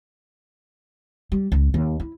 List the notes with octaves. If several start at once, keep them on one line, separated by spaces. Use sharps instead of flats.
G3
C#2
D#2
E4